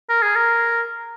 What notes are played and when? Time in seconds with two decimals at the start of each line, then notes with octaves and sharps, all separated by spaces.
0.09 A#4
0.22 G#4
0.36 A#4